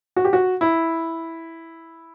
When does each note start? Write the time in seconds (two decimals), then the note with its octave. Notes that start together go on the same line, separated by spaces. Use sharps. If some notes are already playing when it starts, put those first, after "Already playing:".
0.16 F#4
0.25 G4
0.33 F#4
0.61 E4